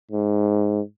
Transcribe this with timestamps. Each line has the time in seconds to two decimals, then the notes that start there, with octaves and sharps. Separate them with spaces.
0.11 G#2